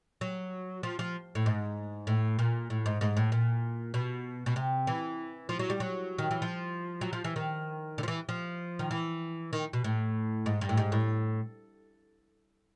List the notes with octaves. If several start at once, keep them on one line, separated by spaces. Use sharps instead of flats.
F#3
F3
F3
A2
G#2
A2
A#2
A2
G#2
G#2
A2
A#2
B2
B2
C3
E3
F3
F#3
G3
F#3
D#3
E3
F3
F#3
F3
E3
D#3
D3
F3
E3
F3
D#3
E3
D#3
B2
A2
G#2
G2
A2
G#2
A2